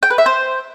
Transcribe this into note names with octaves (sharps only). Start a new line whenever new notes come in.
G5
B4
E5
C5